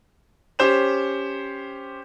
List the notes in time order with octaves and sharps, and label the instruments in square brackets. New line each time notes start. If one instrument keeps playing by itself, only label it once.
[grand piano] C#4 G4 C5 E7